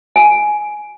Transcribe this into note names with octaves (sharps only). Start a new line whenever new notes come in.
G#5